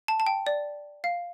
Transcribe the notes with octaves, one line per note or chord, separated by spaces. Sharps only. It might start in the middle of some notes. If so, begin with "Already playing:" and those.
A5
A5
G5
D5
F5